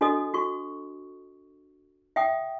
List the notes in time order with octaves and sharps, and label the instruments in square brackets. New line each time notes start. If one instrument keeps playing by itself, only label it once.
[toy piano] D4 F#4 A4 D#5 D#6
F#4 C#6
E5 F#5 G5 D#6